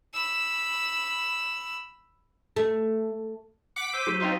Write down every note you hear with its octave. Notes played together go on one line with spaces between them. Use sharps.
B5 E6
A3
F#5 D6 B6
C5 E6 D#7
F#3 B6 D#7
C4 D#4 F4